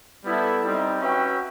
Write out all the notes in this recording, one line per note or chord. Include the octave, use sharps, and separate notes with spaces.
G3 B3 E4 A4
G3 C4 D#4
C#4 F#4 B4 E5 G5